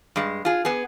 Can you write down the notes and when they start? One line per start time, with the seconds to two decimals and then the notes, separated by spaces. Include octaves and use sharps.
0.16 G2 G#3
0.45 F4 G#4
0.65 B3 G#4